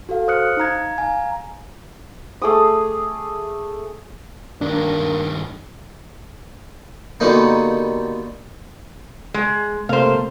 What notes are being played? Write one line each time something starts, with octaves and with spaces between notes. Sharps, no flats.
F#4 A4 F5
C5 D#6 F6 F#6 C#7
D#4 F5 A#5 G#6
F5 G#5 A#5
A3 G#4 D6 D#6
G2 D#3 A#3 D4
B2 D3 G3 A3 A#3 D#4
G#3
C3 A3 A#3 C5 F5